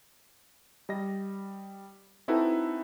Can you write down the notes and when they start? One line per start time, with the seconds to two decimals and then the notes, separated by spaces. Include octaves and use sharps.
0.89 G3 D#5 A#6
2.28 C4 D#4 E4 F#4 A4 B4